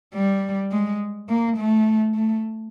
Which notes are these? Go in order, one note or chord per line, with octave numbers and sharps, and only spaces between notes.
G3
G#3
A#3
A3
A3